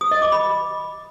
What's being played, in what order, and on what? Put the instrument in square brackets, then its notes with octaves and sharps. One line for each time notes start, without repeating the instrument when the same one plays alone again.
[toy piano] D#6
D#5
D6
B5